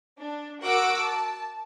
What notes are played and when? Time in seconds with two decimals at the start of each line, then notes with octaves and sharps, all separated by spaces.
0.19 D4
0.63 F#4 A#4 F#5 D6 E6 D7
1.03 A5